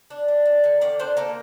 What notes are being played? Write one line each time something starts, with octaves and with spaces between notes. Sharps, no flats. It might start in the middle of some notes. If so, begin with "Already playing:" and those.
D4
D4
D4
D3
D#3 D5
D4 C5
A#3 A4